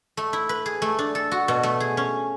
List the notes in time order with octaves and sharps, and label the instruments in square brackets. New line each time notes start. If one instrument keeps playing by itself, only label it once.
[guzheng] A3
E4
B4
G#4
A3
D4
A4
F#4
B2
A3
G#4
C#4